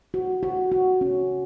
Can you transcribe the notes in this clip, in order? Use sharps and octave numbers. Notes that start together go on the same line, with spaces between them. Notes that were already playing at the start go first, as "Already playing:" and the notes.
F#4
F#4
F#4
C#4